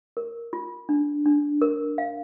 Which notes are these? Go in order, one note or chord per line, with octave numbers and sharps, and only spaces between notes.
A#4
F4
D4
D4
A#4
F5